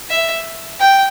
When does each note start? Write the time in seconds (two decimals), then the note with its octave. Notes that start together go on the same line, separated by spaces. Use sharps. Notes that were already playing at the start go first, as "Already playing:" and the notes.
0.10 E5
0.80 G5